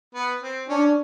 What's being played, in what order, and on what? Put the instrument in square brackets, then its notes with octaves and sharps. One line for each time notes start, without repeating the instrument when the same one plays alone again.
[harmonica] B3
C4
[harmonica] C#4 [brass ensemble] D4